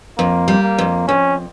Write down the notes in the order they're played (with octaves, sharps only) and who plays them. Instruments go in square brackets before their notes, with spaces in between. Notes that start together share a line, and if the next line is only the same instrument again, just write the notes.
[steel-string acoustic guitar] F2 [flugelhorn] A#3
[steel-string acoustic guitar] G3
[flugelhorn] A#3
[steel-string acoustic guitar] F2
[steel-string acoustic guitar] F2 [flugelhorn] C#4